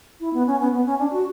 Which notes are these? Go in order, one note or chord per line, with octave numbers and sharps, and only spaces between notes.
E4
B3
C#4
B3
B3
C#4
D4
F#4